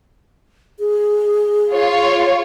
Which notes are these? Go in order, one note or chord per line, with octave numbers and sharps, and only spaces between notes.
G#4
F4 C#5